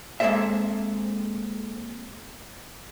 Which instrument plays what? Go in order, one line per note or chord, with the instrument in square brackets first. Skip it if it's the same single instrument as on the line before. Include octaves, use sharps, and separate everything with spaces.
[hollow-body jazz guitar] G#3 A#3 C4 A4 C5 E5